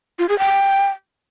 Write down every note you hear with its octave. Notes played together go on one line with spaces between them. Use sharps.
F4
G#4
G5